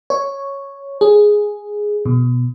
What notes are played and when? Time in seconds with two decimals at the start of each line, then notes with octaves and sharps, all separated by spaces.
0.10 C#5
1.01 G#4
2.05 B2